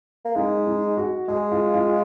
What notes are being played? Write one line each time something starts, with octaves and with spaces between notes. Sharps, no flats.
A#3
G#3 D#4
D#4
F#4
G#3 G#4
F4
F4